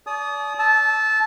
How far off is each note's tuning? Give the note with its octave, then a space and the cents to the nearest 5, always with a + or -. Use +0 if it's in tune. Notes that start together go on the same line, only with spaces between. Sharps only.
D5 -35 A5 -45 D#6 +0
A5 -20 E6 -15